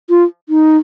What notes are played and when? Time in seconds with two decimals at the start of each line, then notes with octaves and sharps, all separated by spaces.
0.10 F4
0.49 D#4